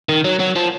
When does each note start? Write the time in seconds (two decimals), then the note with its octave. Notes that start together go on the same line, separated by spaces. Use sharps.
0.09 D#3
0.25 F#3
0.40 F#3
0.56 F3